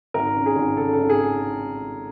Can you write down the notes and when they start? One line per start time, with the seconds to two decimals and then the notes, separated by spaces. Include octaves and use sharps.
0.14 G#1 A#4
0.35 C#3
0.46 G#4
0.56 G#1
0.77 C#3 A4
0.93 A4
0.98 G#1
1.09 G#4